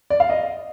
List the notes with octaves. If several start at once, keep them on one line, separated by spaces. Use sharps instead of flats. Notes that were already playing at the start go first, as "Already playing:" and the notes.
D5
F5
D#5